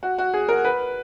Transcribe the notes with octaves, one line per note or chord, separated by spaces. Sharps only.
F#4
F#4
G#4
A#4
B4